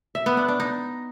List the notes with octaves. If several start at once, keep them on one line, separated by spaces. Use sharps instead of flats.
E5
B3
D4
D4
D#4